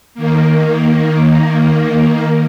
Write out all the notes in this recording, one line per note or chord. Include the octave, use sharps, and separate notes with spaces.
D#3 A#3